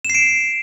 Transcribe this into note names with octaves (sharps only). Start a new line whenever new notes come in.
E7
C7
D7